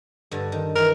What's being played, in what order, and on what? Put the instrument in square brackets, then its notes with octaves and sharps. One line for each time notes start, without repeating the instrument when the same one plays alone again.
[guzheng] G2 D3 D4
D#3
[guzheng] D#3 E3 [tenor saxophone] A#4